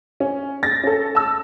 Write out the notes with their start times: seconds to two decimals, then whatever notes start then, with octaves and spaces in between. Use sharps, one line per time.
0.20 C#4
0.63 A6 A#6
0.83 C#4 A4
1.15 A5 E6